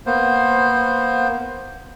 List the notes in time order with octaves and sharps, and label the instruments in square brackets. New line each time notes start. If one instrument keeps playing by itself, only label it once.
[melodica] A#3 B3 C5